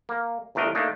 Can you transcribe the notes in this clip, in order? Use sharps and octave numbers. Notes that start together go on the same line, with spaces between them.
A#3
G1 E2 A3 D4 A#4 D#5
A3 A#3 D4 D#4